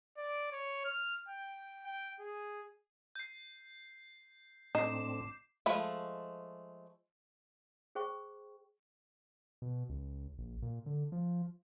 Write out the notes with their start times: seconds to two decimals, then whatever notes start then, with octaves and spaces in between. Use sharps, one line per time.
0.17 D5
0.52 C#5
0.85 F6
1.28 G5
1.86 G5
2.20 G#4
3.15 G6 C7
4.75 A2 C4 D4 D#4 D6 C7 E7
5.66 F3 G#3 A3 B5
7.95 G#4 C5 G5 C#6
9.62 B2
9.90 C#2
10.38 A#1
10.62 A#2
10.86 D3
11.12 F3